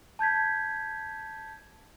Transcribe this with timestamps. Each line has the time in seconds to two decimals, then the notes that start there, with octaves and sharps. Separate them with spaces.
0.19 A5 G6 G#6 B6